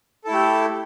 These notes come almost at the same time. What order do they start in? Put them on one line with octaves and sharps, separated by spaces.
A4 E4 A3 G4